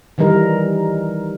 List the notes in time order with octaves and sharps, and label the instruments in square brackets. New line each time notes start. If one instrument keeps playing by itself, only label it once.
[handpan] D#3 E3 G3 D#4 A#4